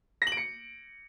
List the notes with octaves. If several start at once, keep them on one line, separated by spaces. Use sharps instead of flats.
A#6
F#7
D7
C#7